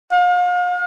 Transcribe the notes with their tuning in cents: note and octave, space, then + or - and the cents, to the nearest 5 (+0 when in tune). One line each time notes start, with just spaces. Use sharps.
F5 +40